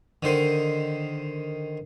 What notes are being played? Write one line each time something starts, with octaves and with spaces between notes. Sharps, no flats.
D3 D#3 C5